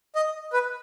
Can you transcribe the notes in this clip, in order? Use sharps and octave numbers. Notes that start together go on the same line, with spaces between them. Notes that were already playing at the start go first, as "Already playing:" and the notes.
D#5
B4